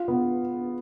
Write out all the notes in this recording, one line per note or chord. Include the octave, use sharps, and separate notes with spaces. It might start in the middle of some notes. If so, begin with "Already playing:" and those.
Already playing: F4
B3